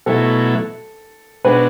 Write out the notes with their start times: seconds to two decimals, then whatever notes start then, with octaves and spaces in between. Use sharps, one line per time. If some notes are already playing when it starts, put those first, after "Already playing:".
0.06 B2 F#3 A3 E4 A4
1.44 B2 G#3 D4 F#4 B4